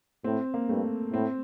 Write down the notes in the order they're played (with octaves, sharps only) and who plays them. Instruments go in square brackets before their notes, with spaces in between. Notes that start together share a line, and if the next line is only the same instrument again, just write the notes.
[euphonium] A2 [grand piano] C4
[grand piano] A#3
[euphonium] G2 [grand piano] A3
[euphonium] A2 [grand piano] C4